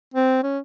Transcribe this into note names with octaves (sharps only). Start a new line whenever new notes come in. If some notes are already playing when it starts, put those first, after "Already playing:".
C4
C#4